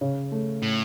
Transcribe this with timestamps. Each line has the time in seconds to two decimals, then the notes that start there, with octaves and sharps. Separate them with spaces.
0.01 C#3 C#4
0.32 A3
0.62 A2